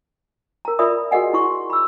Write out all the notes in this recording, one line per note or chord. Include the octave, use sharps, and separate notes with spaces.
A#4 A#5
F4 A#4 D5 E5 B5 D#6
F#4 G#4 A#4 D#5 F#5 G#5
E4 C6 C#6
B5 E6